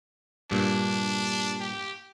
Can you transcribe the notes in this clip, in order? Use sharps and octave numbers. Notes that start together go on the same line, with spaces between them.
G2 A#2 D4
G4